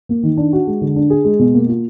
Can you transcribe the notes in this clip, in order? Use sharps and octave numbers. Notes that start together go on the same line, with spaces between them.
A#3
D#3
D4
F#4
G#3
D3
D4
G#4
G#3
B2
A#3
F4